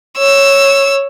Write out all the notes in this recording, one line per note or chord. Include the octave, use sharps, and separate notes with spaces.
C#5 E6